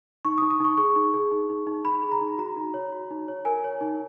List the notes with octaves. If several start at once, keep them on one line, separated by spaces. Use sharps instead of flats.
D#4 C#6
D#6
D#4
D#6
D#4 C#6
G#4 C#6
D#4
G#4
D#4
D#4
D#4
D#4 B5
G#4
A#5
D#4
F#4 A#5
D#4
C#5
F#4
D#4
C#5
A#4 G#5
C#5
D#4